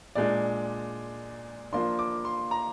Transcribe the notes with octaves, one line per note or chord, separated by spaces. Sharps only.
A#2 G#3 D4 D5
F3 A#3 D4 C6
D6
C6
A#5